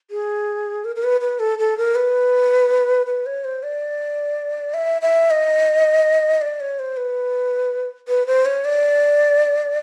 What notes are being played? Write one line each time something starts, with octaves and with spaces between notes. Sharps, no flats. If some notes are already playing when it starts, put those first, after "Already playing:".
G#4
A#4
A#4
B4
B4
A4
A4
A#4
B4
B4
C#5
C5
D5
E5
E5
D#5
D5
C#5
C5
B4
B4
C5
C#5
D5